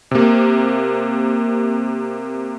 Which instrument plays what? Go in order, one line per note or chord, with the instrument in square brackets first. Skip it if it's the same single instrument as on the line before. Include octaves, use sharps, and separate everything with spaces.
[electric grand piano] C3 A#3